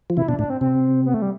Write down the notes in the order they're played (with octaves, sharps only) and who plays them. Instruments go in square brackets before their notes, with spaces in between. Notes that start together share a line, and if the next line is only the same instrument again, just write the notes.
[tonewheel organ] F3
[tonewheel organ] C3 E3 [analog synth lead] E4
[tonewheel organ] B2 [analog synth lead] D4
[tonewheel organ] A2 [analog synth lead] D4
[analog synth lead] C4
[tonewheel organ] C3 [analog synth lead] C4
[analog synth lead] B3
A3
G3